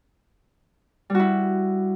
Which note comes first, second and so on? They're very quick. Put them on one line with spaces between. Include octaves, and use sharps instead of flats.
G3 F#4 E4